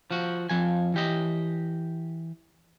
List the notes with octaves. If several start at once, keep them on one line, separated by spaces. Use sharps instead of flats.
F3 F#4
F2 F3 G#5
E3 G4 D#5